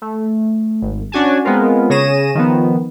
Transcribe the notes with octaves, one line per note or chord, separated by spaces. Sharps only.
A3
G#1
C#4 D4 F#4 G#5 A5
G#3 B3 C4 F4 A#4
C#3 G#4 C#5 A#6 D#7 E7
D#3 F3 B3